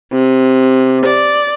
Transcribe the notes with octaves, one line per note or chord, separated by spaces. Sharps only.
C3
D5